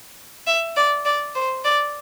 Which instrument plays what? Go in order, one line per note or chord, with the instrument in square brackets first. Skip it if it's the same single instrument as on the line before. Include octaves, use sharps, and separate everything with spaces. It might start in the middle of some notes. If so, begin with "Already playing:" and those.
[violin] E5
D5
D5
C5
D5